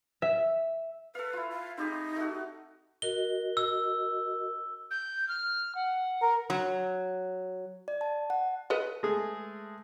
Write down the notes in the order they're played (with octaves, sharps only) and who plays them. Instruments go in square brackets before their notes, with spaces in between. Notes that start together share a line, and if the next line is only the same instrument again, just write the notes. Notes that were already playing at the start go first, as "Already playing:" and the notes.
[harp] E5
[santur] A4 F5 [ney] B4
[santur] E4 F4
[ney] F5
[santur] C4 G4 G#4 [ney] D#4
[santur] A3 F#4
[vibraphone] F#4 A#4 D#5 [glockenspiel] G7
[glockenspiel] E6
[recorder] G6
F6
F#5
[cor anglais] A#4
[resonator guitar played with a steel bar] F#3
[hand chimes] D5
A5
F#5
[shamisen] A4 B4 D#5
[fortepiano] G#3 A3 G#4